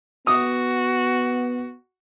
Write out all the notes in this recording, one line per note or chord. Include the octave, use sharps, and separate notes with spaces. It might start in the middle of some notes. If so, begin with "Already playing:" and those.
B3 F#4 D#6